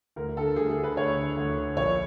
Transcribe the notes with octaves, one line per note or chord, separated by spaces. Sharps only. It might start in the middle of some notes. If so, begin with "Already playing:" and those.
D2 A#4
D3 A4
D2 G#4
G#4
D3
B4
D2 C#5
D3
D2
D3
A#1 C#5